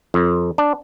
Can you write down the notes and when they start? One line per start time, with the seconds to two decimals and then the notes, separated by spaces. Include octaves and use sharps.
0.14 F2
0.58 D4